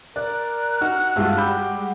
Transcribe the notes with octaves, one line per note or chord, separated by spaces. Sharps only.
A#4 D5 F#6
D#4 F#4 F6
G2 G3 G#3 F4 F#4 E5
G4 B5 E6 G6